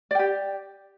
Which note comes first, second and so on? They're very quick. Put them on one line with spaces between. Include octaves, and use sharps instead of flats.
D5 G5 G4